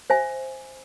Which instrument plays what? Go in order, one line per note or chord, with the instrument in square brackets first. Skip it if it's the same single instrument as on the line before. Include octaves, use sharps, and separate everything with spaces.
[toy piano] C5 E5 G#5